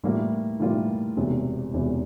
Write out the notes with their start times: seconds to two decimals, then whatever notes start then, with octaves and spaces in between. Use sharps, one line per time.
0.04 A2 E3 G3 A#3 F4
0.60 A2 E3 G3 A#3 F4
1.17 E1 E2 C3
1.73 E1 E2 C3